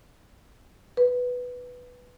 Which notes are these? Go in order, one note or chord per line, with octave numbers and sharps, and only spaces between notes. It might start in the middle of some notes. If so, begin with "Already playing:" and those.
B4